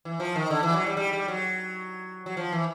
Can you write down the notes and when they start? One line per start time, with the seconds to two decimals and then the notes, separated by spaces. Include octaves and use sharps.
0.05 E3
0.20 F3
0.36 D#3
0.50 D3
0.63 E3
0.74 F#3
0.86 G3
0.97 G3
1.13 G3
1.28 F#3
2.26 F#3
2.37 F3
2.52 E3